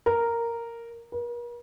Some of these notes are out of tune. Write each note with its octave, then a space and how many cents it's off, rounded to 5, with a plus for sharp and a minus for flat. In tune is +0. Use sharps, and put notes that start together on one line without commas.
A#4 -5
A#4 +45